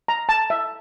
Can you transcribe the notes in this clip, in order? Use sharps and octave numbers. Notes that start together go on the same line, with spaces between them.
A#5
A5
E5